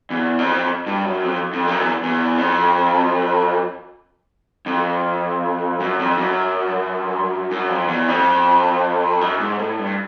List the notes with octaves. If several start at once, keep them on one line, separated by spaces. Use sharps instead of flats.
E2
F2
G2
F#2
F2
F2
F#2
E2
E2
F2
F2
F#2
F2
F#2
F#2
F2
E2
F2
F#2
G#2
A2
G2